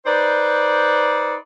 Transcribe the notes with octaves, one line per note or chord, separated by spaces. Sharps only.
D#4 B4 C5 D5